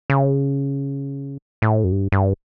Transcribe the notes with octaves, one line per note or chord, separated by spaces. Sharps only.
C#3
A2
F#2
G2
G2